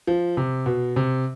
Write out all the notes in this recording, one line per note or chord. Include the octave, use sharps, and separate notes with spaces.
F3
C3
B2
C3